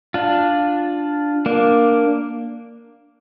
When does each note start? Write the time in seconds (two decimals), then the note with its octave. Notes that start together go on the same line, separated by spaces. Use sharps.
0.14 D4 F4
1.46 A#3 D4